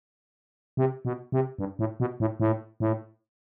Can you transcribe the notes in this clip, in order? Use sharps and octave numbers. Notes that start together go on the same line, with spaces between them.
C3
B2
C3
G2
A2
B2
A2
A2
A2